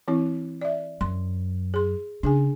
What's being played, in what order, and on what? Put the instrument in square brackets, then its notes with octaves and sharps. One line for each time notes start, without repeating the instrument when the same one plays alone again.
[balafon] E3 C4 E4
D5 E5
[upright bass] F#2 [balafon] C6
[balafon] G#4 C6
[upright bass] C#3 [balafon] D4 G#4 G#5